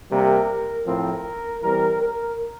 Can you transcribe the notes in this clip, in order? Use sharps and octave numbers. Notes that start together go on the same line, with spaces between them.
C3 G3 A#3 A#4
A2 F3 C4 A#4
E3 G3 C4 A#4
A#4